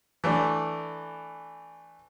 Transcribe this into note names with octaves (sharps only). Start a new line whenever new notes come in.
E3 A3 D4